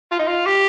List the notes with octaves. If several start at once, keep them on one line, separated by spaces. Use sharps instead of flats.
F4
D#4
F4
G4